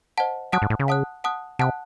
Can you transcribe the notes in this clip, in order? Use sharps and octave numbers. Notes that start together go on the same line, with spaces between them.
C5 D#5 F#5 A5
F#3 F#5 A5 D#6 F#6
G#2
A2
C#3
F#5 A5 D#6 F#6
F#5 A5 D#6 F#6
C3 F#5 A5 D#6 F#6